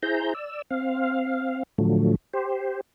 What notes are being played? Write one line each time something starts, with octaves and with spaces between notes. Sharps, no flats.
E4 G#4 C5 A#5 G6
D5 E6
C4 F5
A2 D3 F3 F#3 A3
G4 C5